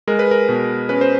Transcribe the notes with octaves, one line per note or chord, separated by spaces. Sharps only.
G#3 A#4
B4
A#4
B2
C#4 B4
C5